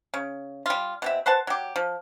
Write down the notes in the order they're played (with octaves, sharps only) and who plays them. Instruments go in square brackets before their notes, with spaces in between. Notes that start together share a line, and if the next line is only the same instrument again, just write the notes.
[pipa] C#3
G3 F4
B2 C4 E5
B4 C5 F#5 A5
F#3 G4
F3